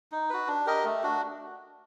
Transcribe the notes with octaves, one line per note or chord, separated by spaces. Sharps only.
D#4
F#4 B4
D4
G4 A#4 D#5
A3
D4 F#4